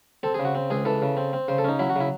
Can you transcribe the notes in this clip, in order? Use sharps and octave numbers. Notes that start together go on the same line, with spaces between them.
C4 A4
G#4
C#3
F#4
C4
C#2 G#4
E3 A4
C#3
C4
C4
C#3 C5
A4
C#4 D#4
F#3 E4
F#4
C#3 E4